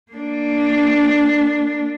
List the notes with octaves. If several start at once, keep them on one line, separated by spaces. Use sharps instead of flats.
A#3 D4